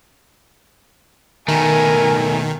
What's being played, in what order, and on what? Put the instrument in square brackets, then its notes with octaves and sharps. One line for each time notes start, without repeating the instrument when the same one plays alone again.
[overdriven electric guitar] B2 A3 [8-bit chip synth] D#3 [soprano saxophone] A#4 [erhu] G#5